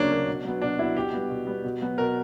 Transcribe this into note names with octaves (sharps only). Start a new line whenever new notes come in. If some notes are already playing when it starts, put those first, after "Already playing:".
Already playing: C#3 F#3 A#3 C#4 D4
F#3 A#3
B2
F#3 B3
B2 D4
F#3 B3 E4
B2 G4
G3 B3
B2
G3 B3
B2
F#3 B3
B2 A#4